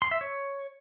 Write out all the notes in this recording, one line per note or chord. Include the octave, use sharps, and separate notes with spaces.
C6
E5
C#5